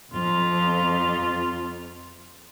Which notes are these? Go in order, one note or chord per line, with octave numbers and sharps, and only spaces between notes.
F2 F4